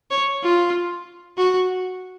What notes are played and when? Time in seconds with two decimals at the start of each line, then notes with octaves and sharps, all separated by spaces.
0.11 C#5
0.43 F4
1.37 F#4